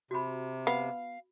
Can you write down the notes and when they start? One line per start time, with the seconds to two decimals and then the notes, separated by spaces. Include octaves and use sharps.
0.11 C3 F#4 B5
0.67 B3 F5